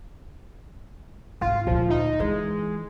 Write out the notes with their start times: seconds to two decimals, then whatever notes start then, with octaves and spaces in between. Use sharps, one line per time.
1.41 G#1 G#2 F4
1.67 D2 A#2 F3
1.90 D#4
2.20 E3 G#3